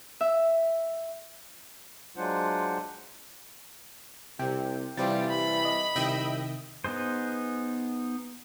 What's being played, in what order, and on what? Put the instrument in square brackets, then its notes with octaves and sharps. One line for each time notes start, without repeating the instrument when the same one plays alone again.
[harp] E5
[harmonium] F#3 G#3 D4 F4 C5 F#5
[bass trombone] C2 [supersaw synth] C3 [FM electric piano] G5
[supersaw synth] C3 G3 [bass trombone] E3 [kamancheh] F4 G4 [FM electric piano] A6
[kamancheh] B5
[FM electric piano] D#5
[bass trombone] C2 [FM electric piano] C3 D#3 [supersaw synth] D#5 E5 G5
[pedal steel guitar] B3 D#4 G#4 C5